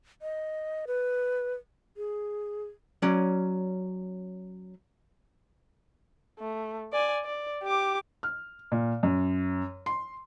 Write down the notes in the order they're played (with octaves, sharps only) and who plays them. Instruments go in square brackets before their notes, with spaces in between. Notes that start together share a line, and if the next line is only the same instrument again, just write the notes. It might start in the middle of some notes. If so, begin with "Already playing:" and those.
[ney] D#5
B4
G#4
[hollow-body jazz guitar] F#3 C#4 D5
[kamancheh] A3
D5 G#5
D5
G4 D6
[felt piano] F6
A#2
F#2
C6